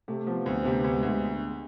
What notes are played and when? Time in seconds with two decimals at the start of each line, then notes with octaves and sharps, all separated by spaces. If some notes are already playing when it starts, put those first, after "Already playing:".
0.08 C3 A3
0.26 F3 B3
0.45 D2 C4
0.65 C3 B3
0.84 D2
0.94 G#3
1.03 D2
1.08 G#3